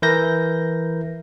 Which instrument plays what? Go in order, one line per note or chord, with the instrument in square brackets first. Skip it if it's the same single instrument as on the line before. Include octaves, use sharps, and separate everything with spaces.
[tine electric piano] E3 E4 A#4 G6 A#6